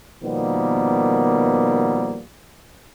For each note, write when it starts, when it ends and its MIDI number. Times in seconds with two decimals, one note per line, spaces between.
0.24 2.21 47
0.24 2.21 51
0.24 2.21 53
0.24 2.21 55
0.24 2.21 58
0.24 2.21 59